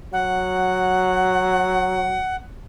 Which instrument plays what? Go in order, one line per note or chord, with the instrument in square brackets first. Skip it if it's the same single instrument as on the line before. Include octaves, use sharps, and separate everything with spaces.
[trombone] F#3 [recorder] F#5